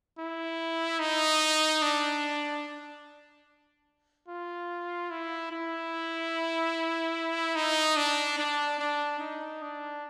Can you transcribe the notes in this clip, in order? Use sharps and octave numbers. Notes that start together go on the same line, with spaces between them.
E4
D#4
D4
F4
E4
E4
D#4
D4
D4
D4
D#4
D4